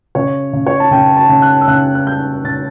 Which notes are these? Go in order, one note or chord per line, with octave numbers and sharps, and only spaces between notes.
C#3 C#5
C#3
C#5
A5
C#3 G5
A5
C#3
F#6
E6
C#3 F#6
F#6
G3 G6
C#3 A6